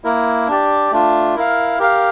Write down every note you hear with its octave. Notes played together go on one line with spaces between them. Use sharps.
A#3 E4 A#4
D4 G4 D5
A3 D4 F4
E4 A#4 F5
G4 A#4 F5